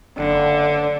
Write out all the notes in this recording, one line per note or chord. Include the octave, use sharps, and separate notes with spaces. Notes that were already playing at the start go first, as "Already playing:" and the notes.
F#1 D3